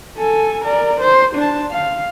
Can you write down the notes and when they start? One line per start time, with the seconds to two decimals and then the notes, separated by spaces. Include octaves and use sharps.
0.18 A4 G#5
0.64 A#4 D5
1.00 C5
1.35 D4 A5
1.71 F5